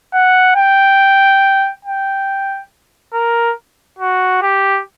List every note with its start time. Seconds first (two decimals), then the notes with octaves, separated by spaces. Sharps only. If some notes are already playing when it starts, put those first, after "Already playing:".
0.13 F#5
0.56 G5
1.85 G5
3.14 A#4
3.99 F#4
4.42 G4